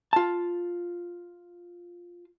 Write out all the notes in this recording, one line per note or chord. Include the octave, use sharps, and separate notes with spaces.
F4 A5